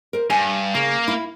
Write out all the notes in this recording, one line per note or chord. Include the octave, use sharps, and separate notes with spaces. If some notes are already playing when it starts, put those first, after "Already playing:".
A#4 C5
G2 G#5
C#3 A#3
E4